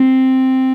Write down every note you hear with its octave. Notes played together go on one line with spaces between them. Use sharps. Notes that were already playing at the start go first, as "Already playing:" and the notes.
Already playing: C4